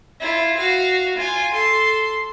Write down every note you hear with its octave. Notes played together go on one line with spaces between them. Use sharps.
E4 F4
F#4 F5
F4 G#5
A4 C6